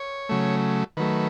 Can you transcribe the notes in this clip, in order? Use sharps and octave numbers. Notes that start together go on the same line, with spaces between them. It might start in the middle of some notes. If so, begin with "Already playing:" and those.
Already playing: C#5
C#3 F#3 A3
D#3 F#3 A3 B4